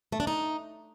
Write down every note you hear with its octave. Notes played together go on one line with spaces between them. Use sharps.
A3
D4
D#4